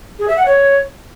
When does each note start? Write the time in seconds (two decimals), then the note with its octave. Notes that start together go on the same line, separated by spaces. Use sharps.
0.19 G#4
0.28 E5
0.37 F#5
0.46 C#5